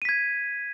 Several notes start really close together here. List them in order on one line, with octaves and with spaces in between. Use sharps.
D#7 B6 G#6